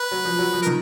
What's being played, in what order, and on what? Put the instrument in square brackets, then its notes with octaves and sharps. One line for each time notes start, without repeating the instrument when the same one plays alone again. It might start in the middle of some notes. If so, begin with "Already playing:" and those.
Already playing: [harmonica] B4
[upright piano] F#3
F3
F#3
F3
[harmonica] A#4
[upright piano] D#3